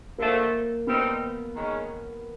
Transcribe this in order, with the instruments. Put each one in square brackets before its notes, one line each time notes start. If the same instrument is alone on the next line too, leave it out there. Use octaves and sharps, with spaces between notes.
[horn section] D3 F3 A3 [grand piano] A#3
[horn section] G3 C4 D#4 [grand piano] B3
[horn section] D#3 G#3 C#4